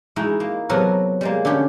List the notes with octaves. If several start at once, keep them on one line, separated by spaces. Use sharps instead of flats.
G#3 D#4 E4 F#4
A#3
C3 F#3 B3 F#4 A4 A#4
G3 G#3 A#3
D3 A3 C#4 G4 C#5